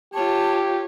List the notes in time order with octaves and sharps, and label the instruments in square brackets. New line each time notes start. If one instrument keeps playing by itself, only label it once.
[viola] F4 C#5 [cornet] G4 [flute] A5